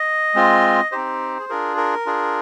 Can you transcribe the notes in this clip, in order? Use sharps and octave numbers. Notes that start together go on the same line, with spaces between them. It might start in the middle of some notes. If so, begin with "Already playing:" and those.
Already playing: D#5
G#3 C4 F4
C4 D#4 G4 C5
G#4
D4 F4 G#4 A#4
A#4
D4 F4 G#4